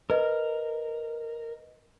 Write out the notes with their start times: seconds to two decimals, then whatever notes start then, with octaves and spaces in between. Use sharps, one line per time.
0.10 A#4 B4 D#5